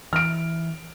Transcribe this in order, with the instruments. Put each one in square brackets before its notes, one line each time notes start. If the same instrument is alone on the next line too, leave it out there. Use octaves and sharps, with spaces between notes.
[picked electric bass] E3 [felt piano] F6 D7